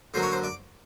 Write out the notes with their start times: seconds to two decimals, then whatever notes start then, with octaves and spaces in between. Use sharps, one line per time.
0.14 D3 F#3 A#3 D4 C5
0.23 C#5
0.32 C5
0.44 D5